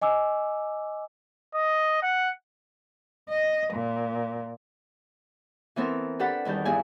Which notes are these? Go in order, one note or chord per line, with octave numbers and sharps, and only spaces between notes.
D#5 G#5 D6 E6
D#5
F#5
D#5
A#2
E3 B3 C4 A4 A#4
D4 G4 A4 B4 F#5 B5
E2 D#3 G3 A5 G6
G2 B3 E4 G#4 G#5